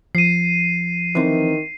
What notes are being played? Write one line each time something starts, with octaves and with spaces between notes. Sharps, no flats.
F3 C7 D#7
D#3 E3 C4